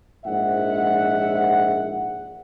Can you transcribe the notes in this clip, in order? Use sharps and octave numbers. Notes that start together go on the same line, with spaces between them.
A#1 G#2 E5 F#5